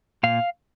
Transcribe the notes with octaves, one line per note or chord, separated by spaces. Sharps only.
A#2 F5